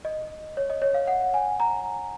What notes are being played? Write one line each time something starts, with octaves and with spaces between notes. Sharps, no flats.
D#5
C#5
D#5
C#5
F5
F#5
G#5
A#5